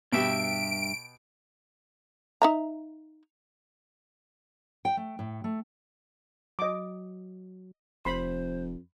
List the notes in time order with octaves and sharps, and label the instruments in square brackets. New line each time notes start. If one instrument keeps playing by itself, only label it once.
[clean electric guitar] G2 E5 [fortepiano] B2 G4 [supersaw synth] D7
[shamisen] D#4 E5 A#5
[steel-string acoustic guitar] G5
A3
A2
A3
[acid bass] F#3 [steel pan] D#5 D6
[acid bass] F1 [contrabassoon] F2 [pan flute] C5 [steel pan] B5 C6